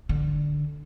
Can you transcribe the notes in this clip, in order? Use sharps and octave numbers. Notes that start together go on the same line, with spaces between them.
D3